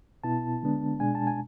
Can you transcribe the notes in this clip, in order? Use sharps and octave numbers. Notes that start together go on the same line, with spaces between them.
B2 B3 E4 A5
D3 G#3 B3 D4
B2 G#3 D4 G#5
A5
G#5